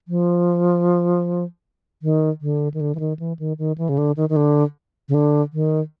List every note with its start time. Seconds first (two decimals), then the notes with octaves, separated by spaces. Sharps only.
0.08 F3
2.02 D#3
2.41 D3
2.74 D#3
2.81 D3
2.95 E3
3.00 D#3
3.19 E3
3.39 D#3
3.59 D#3
3.78 E3
3.89 C#3
3.98 D3
4.17 D#3
4.29 D#3
4.36 D3
5.09 C#3
5.14 D3
5.53 D#3